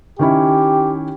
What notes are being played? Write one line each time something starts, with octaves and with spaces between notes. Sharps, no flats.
D#3 C#4 E4 G4